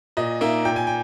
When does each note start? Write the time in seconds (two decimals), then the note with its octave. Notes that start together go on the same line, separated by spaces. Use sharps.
0.17 A#2 D#5
0.41 A#3 D#4 E5
0.65 A#2 G5
0.76 G#5
0.87 G5